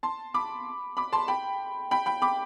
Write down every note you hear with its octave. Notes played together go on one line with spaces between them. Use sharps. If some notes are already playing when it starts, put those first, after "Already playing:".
A5 C6
B5 D6
B5 D6
A5 C6
G5 B5
G5 B5
G5 B5
B5 D6